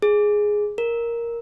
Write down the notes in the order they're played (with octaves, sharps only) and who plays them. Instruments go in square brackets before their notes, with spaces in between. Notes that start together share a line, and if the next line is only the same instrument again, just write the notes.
[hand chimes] G#4
A#4